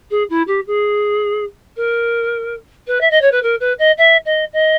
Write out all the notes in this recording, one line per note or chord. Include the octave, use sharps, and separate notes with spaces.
G#4
E4
G4
G#4
A#4
B4
E5
D#5
C#5
B4
A#4
B4
D#5
E5
D#5
D#5